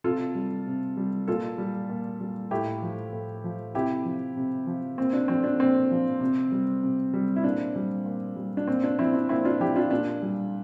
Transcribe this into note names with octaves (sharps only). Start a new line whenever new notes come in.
C3 F4 A4
G3
C3
G3
A#2 F4 A4
G3
A#2
G3
A2 E4 G4
F3
A2
F3
C3 E4 G4
F3
C3
F3
A#2 C4
D4
F3 C4
D4
A#2 C4
F3
C3
G3
C3
G3
E4
A#2 D4
G3
A#2
G3
D4
A#2 C4
D4
F3 C4 E4
D4
A#2 C4 E4
D4 F4
F3 E4 G4
D4 F4
A#2 D4
G3